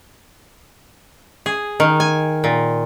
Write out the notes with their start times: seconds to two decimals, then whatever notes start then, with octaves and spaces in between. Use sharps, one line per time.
1.46 G#4
1.80 D#3
2.00 G#5
2.44 A#2